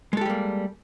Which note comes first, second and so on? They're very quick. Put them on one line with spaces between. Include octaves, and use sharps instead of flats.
G#3 A4 G4 G3 A#3